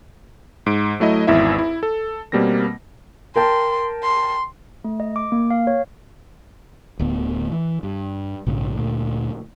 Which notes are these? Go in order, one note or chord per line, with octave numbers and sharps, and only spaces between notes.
G#2 D7
F#3 A3 E4 D#5
G#1 E2 E4 E5
E4
A4
B2 G3 A#3 C4 A#6
A#4 G5 A5 C6
C6
A3
D#5
D6
A#3
F5
C#5
D1 D2 B3
E3
G2
A#1 G#2 C#3
D2 A#2